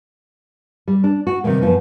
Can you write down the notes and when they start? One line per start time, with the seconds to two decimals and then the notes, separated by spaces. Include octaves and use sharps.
0.88 G3
1.04 D4
1.27 F#4
1.44 C3 D#3 G3 G#3 A#3
1.61 F#2 F3 B3